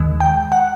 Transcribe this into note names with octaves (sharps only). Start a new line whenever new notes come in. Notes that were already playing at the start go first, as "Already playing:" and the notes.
Already playing: D#2 D#3 G#3
G5
F#5